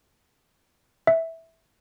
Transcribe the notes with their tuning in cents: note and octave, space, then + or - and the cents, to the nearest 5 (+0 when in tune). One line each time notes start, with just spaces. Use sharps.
E5 -10